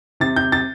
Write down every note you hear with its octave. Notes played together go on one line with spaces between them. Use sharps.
C3 A6
G6
A6